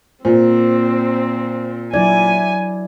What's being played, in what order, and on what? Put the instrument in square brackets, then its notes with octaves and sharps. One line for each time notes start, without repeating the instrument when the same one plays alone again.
[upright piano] A#2 [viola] C4 [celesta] C5
[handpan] F#3 E4 D5 [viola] G#5 [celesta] G#6